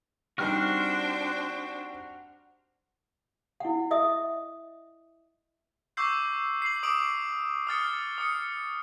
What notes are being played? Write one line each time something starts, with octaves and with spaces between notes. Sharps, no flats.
G3 C4 D4 D#4 F#4 C5 G5 F6
E4 F#5
D#5 E5 D#6
C#6 D6 E6 G6 C7
C7 F#7
D6 D#6 D7 F#7
D#6 F6 A6 C#7
D#6 C#7